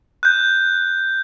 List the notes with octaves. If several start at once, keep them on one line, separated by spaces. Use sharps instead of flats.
F#6 G6